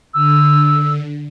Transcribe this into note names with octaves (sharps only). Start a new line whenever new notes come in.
D3 E6